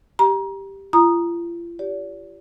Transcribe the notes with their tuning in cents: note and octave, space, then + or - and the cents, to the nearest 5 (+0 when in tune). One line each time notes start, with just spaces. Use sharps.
G4 +0 A#5 +30
F4 -40 A#5 +15 D#6 -10
G4 +0 D5 -40